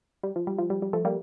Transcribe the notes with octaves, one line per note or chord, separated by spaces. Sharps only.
G3
F3
G3
F3
G3
G3
F3 A3
G3 A#3